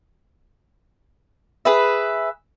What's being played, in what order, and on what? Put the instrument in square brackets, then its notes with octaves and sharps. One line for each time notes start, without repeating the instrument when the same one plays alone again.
[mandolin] G#4 B4 E5